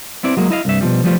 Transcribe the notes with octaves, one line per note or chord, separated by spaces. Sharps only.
B3 C4 E4 D5
F#3 G#3 A#3
E4 D#5 F5
C2 G2 E5
B2 F3 G3
F3 G3 A3 B3 F4